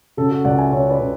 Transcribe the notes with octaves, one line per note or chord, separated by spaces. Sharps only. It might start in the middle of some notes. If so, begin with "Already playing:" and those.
C#3 F#4 A4
F#4 A4
C#2 D5 F#5
E5 G#5
C#3 C#5 E5
B4 D5
C#3